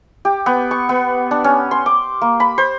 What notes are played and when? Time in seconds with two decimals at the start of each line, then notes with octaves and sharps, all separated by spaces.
0.25 G4
0.46 B3
0.71 C#6
0.89 B3
1.31 D4
1.44 C#4
1.71 C6
1.86 D6
2.21 A#3
2.40 B5
2.58 C5